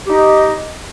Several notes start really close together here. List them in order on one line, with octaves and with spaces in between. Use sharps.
G4 D#4 D#5